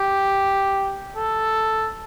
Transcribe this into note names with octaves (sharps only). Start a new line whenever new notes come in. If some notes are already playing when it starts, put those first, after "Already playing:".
Already playing: G4
A4